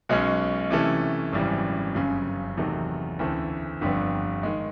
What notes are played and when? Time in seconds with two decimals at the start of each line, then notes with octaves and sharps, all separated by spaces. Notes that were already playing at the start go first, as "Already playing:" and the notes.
0.09 B1 B2 G#3 C#4
0.70 C3 E3 A3 C#4
1.33 G#1 F#2 C#3 E3 G3
1.95 G1 F#2 C#3
2.57 E2 C3 D#3 F#3 A3
3.19 D2 C#3 E3 A3 C4
3.81 G1 F2 D3 G3 B3
4.43 D#3 G#3